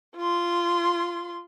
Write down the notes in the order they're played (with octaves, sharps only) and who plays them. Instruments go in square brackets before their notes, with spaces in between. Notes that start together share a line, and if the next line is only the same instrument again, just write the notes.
[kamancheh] F4 C6